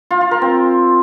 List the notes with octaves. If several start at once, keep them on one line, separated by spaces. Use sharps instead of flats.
F4
F4
A#4
C4